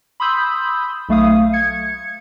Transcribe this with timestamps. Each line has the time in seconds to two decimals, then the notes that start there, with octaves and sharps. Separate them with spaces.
0.20 B5 C6 D#6 E6 G6
1.09 B1 A3 F5 D#6
1.53 G#6 C#7